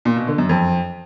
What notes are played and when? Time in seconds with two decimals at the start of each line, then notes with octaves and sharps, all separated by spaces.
0.05 A#2
0.16 B2
0.27 D3
0.38 F#2
0.49 F2